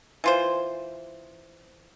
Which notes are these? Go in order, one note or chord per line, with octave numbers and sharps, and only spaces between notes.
E3 F4 C5